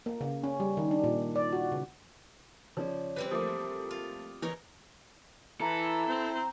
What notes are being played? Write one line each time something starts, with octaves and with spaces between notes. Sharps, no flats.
A#3
C#3
C#4
G3
D#3
D4
A#2
D5
F#4
C#3
C#3 F3 C#5 D5
E3 G3 C4 B4
F3 A3 A#3 A4 D6 D#6
F4
E3 D#4 A#4 C#5
E3 E4 A4 A#5
C4 C5